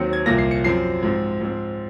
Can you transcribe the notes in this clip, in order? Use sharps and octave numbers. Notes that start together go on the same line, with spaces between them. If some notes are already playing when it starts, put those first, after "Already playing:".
Already playing: D#2 D#3 F#3 C4 C#7
G#6
C2 A#2 F3 A#3 A#6
C7
C#7
F#2 F3 C4 C7
G#2 F3 C4
G#2 F3 C4